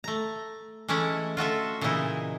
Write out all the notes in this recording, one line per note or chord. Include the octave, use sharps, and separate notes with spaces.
A3 A#5
E3 G#3 A3 C#4 E4
F4 F#4 A4 E5
A#2 C#3 E3 G#3 D#4 E4